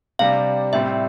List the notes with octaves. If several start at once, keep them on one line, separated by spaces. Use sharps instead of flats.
C3 G3 D4 F5
A2 G3 C4 E5